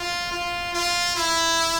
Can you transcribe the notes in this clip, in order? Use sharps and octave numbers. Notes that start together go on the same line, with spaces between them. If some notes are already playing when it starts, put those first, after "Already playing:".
Already playing: F4
F4
F4
E4